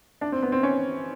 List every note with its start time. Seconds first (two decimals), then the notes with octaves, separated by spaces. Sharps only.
0.21 D4
0.32 C4
0.42 B3
0.52 C4
0.63 C#4